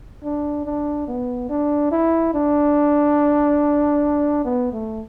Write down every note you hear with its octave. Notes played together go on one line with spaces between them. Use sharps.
D4
D4
B3
D4
E4
D4
B3
A3